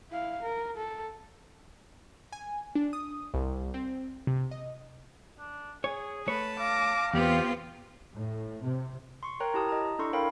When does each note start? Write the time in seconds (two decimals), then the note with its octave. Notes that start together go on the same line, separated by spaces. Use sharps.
0.10 E4 F5
0.42 A#4
0.77 A4
2.32 G#5
2.75 D4
2.93 D#6
3.34 C2
3.74 C4
4.27 C3
4.51 D#5
5.39 D4
5.84 G#4 C#5
6.27 A3 B4 C#5 A5
6.59 F5 D6 A#6
7.14 E2 B3 C4 F4 G4
8.13 A2
8.63 C3
9.23 C6 C#6
9.40 A#4 C#5 G5 A#5 F#6
9.54 E4 G4 A5 D#6
9.69 D#5 A#5
9.99 D4 E4 A4 C6 C#6
10.13 A#4 C#5 F5 G5 B5 C#6